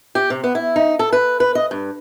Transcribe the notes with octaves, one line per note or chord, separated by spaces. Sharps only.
G4
C3
B3
E4
D#4
A4
B4
B4
D#5
G2